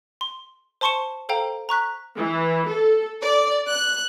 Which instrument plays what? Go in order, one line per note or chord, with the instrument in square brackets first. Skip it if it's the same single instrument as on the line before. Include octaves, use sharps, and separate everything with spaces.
[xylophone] C6
C5 A5 C6 C#6 C#7 E7
A4 C5 F5 G5 A#5
A#5 C#6 F#6 B6
[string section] E3
A4
D5
F#6